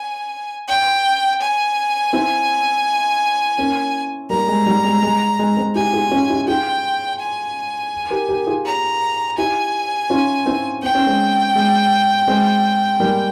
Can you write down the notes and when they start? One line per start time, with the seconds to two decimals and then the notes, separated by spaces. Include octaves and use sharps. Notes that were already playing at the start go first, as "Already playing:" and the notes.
Already playing: G#5
0.68 G5
1.41 G#5
2.13 C4 E4
3.58 A#3 C#4
4.30 G3 A#3 A#5
4.48 G#3
4.66 G3
4.84 G#3
5.03 G#3
5.39 G#3
5.57 G#3 C4
5.75 E4 G4 G#5
5.93 F4 G#4
6.11 C#4 F4
6.30 E4 G4
6.48 F4 G#4 G5
7.20 G#5
8.10 G4 A#4
8.29 G4 A#4
8.47 F4 G#4
8.65 A#5
9.37 E4 G4 G#5
10.10 C#4 F4
10.46 C4 E4
10.83 C4 G5
10.95 C#4
11.06 G#3 C4
11.55 G#3
12.28 G#3 C4
13.00 G3 A#3